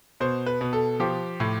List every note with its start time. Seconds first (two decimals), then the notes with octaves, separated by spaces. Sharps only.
0.20 B2 C5
0.46 B4
0.61 B2
0.73 A4
1.00 F3 G4
1.40 A2